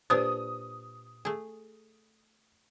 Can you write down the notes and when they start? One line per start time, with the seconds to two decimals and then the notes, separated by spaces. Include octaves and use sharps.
0.10 A#2 D4 G4 B4 C5 D#6
1.25 A3 G#4